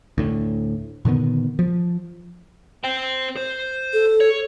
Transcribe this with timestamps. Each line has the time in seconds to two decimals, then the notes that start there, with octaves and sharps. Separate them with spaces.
0.18 D2 A2
1.05 A#2 D3 D#3 B3
1.59 F3
2.84 C5 G5
3.37 C5
3.93 A4
4.21 C#5